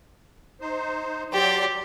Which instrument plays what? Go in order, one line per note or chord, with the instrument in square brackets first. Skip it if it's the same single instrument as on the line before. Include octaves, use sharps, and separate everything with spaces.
[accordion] D#4 C5
[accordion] F#3 D5 C6 [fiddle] G4